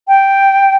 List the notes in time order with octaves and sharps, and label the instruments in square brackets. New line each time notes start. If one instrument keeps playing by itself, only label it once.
[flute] G5